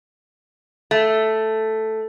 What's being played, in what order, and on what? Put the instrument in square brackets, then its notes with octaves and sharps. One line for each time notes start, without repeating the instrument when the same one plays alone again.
[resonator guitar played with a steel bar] A3